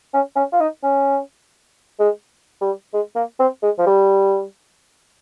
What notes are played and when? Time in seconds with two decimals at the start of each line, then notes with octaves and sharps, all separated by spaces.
0.14 C#4
0.36 C#4
0.53 F4
0.60 D#4
0.83 C#4
2.00 G#3
2.61 G3
2.93 G#3
3.16 A#3
3.40 C4
3.63 G#3
3.79 F3
3.86 G3